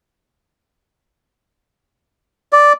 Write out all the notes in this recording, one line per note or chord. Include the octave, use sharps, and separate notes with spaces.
D5